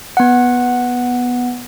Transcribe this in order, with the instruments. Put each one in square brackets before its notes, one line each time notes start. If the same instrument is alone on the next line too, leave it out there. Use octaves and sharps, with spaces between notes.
[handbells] B3 F#5